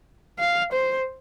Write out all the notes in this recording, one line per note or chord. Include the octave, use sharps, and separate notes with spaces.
F5
C5